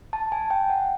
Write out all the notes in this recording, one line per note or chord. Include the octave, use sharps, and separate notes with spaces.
A5
G#5
G5
F#5